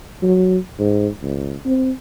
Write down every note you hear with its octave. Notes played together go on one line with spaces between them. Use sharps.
F#3
G#2
C#2
C4